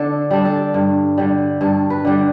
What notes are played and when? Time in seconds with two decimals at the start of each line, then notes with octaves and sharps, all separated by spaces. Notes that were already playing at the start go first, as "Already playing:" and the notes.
Already playing: D3 D4 A4
0.31 G3 D4
0.45 A4
0.74 G2
1.18 D3 G3
1.61 G2 A4
1.90 B4
2.05 D3 G3